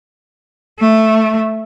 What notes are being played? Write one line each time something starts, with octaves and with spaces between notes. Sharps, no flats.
A3